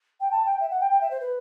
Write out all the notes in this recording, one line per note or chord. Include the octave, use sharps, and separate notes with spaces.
G5
A5
G5
E5
F#5
G5
G5
E5
C5
B4